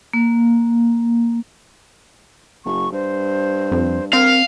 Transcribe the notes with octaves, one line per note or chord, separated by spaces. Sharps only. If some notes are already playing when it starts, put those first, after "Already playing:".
A#3
F#1 C#6
G2 C5
F2
C4 A#4 F5